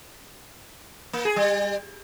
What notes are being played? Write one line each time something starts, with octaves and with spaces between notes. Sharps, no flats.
A#3
G#4
G3